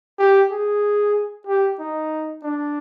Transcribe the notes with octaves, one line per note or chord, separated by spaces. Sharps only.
G4
G#4
G4
D#4
D4